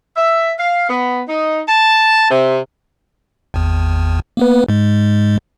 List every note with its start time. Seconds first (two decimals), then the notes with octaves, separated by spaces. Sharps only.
0.16 E5
0.59 F5
0.88 B3
1.28 D#4
1.68 A5
2.30 C3
3.54 G#1 E2
4.37 A#3 B3 B4
4.69 G#2 G#3